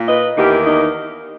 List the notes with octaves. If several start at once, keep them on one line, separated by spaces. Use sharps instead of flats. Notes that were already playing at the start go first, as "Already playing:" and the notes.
Already playing: A#2 A#3
B4 D#5
E2 D#3 A#3 D#4 G4
D#4